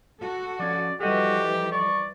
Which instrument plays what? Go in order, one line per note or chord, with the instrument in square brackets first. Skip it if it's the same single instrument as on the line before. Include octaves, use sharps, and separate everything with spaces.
[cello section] F#4 A4
[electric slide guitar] F3 C#4 [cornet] D5
[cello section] E3 F3 G3 [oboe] F#4 [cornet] G4 [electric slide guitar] A4 D#5
[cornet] D5 [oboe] C#6